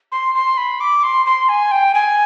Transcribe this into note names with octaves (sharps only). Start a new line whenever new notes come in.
C6
C6
B5
D6
C6
C6
G#5
G5
G#5